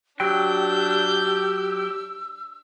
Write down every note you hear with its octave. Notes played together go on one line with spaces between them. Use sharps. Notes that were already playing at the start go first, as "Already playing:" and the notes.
F#3 D4 G4 G5 E6 G6